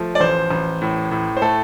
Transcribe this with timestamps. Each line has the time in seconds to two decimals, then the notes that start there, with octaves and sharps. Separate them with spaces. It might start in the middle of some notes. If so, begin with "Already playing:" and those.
Already playing: F3 A3
0.15 D5
0.20 A1 C5
0.51 A1
0.82 A2
1.11 A2
1.37 C5
1.42 A3 A4